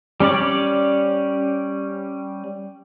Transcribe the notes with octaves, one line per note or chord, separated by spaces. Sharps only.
G3 C#4 C#5 D5